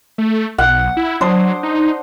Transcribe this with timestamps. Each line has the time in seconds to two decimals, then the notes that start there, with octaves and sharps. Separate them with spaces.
0.18 A3
0.58 B1 F#5
0.97 E4
1.21 F#3 D4 C5 D#6
1.63 D#4